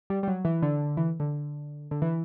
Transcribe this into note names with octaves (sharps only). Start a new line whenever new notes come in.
G3
G3
F#3
E3
D3
E3
D3
D3
E3